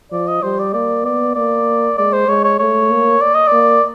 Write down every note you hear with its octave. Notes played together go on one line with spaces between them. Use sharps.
F3 D5
D#5
G3 C5
D5
A#3 D5
B3 D5
A#3 D5
G#3 D5
C5
G#3 C#5
C#5
A3 C#5
A#3
D5
D#5
A#3 D5